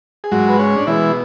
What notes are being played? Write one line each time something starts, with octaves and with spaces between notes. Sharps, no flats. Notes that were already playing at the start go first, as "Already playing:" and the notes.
G#4
G#2 F#3 G#3 F#4
B4
C#4 C#5
D4
B2 E3 G#3 E4